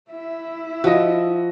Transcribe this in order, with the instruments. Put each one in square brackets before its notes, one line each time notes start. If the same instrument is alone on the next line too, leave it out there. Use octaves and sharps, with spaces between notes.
[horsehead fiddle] E4 E5
[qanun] F3 [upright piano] F#4 D#5